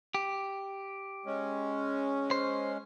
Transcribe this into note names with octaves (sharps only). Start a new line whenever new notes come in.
G4
G#3 C#4
C5